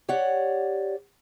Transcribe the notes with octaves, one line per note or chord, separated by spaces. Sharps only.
G4 C#5 D5 F#5